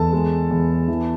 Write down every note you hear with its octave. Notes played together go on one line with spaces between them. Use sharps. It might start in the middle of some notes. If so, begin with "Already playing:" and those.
Already playing: E2 A4 A5
G#3
E2
E3